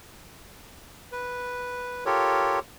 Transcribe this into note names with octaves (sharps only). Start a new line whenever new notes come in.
B4
F4 G4 A4 A#4 C#5